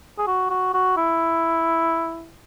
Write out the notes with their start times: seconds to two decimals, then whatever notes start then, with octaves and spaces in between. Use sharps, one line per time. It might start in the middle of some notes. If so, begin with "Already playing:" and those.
0.18 G#4
0.27 F#4
0.50 F#4
0.74 F#4
0.97 E4